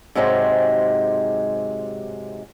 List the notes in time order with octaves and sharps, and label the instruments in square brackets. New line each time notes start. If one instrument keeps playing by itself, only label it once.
[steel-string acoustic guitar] G#2 C3 F#3 G#3 G4